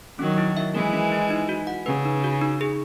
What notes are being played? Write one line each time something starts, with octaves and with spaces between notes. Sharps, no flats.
D#3 F#3 C#4
E4
E5
E3 G#3 A#4
C#4
E4
D#4
F#4
F#5
C#3 B4
D#4
F#4
D#4
G#4